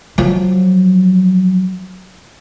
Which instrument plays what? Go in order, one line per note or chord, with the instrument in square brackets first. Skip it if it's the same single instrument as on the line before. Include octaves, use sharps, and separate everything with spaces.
[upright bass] F3 F#3